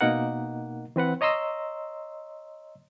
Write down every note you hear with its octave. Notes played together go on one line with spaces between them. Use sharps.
B2 A#3 D#4 A#4 F#5
E3 C4 B4 F#5
C#5 D#5 A#5 C6 E6